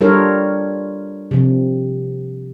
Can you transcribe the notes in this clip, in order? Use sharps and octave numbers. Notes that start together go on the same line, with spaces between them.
G3 D4 F4 A4 A#4 C#5
C3 F3